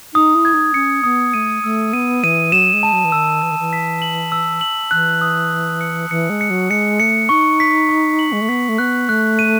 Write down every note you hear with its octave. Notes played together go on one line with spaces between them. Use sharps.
D#4 D#6
E4
G#6
D#4
C#4 C#7
B3 D#6
A3 D#7
A3 E6
B3 D#7
E3 D#7
F#3 E7
G#3
A5
F#3
E3
D#3 E6
E3 E6
D#3
E3
B6
F#7
E6
F#7
E3 F#6
D#6
F#6
C#7
E3 C#7
G#3
C#7
F#3
G#3 C#7
A3 C#7
D#4 C#6
B6
C#6
F#7
G#3
A3
B3 B6
A3
B3 F#6
A3 F#6
D#7